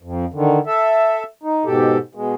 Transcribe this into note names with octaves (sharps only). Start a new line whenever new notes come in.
F2
D3 D#3
A4 E5
D#4
G#2 B2 G4 A4
B2 G#3